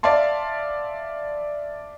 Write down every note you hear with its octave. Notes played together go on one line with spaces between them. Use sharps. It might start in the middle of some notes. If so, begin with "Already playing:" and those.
D5 E5 F5 A5 C6